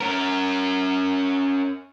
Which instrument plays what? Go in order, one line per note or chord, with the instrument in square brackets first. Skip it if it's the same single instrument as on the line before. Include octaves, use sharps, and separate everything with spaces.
[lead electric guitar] C#4 A#4